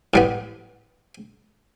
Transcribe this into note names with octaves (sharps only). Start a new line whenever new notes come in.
A2 G3 B3